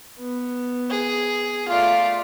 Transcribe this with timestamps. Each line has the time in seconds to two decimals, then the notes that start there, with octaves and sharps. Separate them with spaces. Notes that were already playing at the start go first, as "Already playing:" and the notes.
0.19 B3
0.90 G#4
1.68 A3 F4 D5 F5